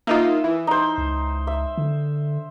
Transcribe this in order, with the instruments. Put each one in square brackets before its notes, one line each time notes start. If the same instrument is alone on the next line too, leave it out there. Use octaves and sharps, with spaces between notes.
[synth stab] A#3 D#4 F4 [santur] E5 D#6
[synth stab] E3
[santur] D#4 C5
[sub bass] C#2
[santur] E5
[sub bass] D3